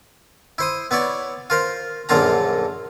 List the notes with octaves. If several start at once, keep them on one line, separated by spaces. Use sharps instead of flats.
E4 C5 D#6
B3 E4 C#5 D5
F4 A#4 C5
A#1 F#2 D3 A#3 F4 A#5